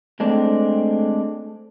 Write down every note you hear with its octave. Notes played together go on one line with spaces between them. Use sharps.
G#3 A3 C4 D4